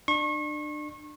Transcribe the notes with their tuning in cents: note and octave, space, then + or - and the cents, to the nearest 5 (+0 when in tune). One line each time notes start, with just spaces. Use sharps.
D4 +30 C#6 -35